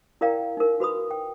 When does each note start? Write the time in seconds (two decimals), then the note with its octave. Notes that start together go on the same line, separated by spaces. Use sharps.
0.21 E4 A#4 D5 F5 G5 A#5
0.57 D#4 A#4
0.80 F#4 B4 B5 D#6
1.11 G5